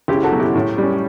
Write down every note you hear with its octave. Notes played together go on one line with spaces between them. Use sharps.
C#2 E4 G4
F#4 A4
B2 F#3 C#4
E4 G4
A2
G3 C#4